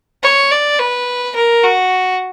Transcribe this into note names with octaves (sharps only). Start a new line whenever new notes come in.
C#5
D5
B4
A#4
F#4